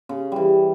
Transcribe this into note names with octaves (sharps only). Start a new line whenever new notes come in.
C#3
E3 G3